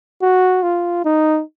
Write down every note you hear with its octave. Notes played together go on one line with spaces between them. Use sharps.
F#4
F4
D#4